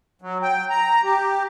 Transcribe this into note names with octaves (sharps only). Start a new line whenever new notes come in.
F#3
G5
A#5
G4